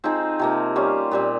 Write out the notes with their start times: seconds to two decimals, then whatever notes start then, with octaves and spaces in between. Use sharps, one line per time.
0.04 F3 C4 D#4 G#4
0.39 C3 F3 A#3
0.76 G3 C#4 F4
1.11 A#2 G3 C4